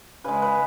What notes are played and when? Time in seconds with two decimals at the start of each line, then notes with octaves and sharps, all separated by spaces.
0.24 C#3 G#3 B4
0.42 B4